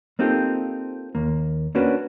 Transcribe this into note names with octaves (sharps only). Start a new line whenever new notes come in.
A#3 C4 D#4 F4 G4 A4
D#2 A#3
A#3 C#4 D4 F#4 B4